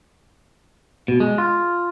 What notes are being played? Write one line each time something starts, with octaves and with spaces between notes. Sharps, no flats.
B2
G#3
F4